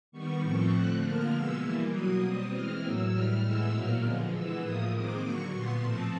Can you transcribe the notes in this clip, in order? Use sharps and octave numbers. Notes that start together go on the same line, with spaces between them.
D#3 G3 B3 C#6
A2 F3 A3 C4 C#6
D3 F3 A3 C4 F#6
D3 F3 A#3 F6
B2 G#3 B3 E6
E3 G3 A#3
B2 F#3 A#3 D#6
B2 G3 C4
E3 G#3 C4 F6
A2 F#3 A#3 E6
A2 E3 G3 F6
A2 E3 G#3 B3 E6
A#2 F#3 A#3 F6
D3 F3 G#3 B3
E3 G#3 B3 E6
A2 F3 A#3 D#6
D#3 G#3 C4 D6
D3 F#3 A#3 C#6
A#2 G3 B3 C6
A2 F3 A3 C4 A5